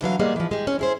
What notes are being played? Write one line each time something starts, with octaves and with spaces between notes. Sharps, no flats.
D3 E3 F#3 F5
G3 G#3 A#3 B3 G#4
E3 F3
G#3 G4
C#4
E4 G#4 C5